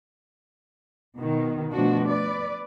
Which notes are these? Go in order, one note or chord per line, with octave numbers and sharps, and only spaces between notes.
B2 D#3
B2 F3 A3 D4 F#4
B4 D5